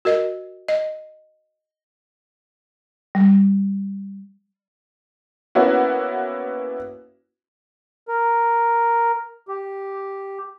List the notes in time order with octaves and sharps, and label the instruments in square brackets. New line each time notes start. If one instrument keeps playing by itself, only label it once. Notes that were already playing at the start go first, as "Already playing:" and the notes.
[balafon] F#4 A#4 D#5
D#5
[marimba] G3
[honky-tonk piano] A#3 B3 C#4 E4 F#4
[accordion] A#4
G4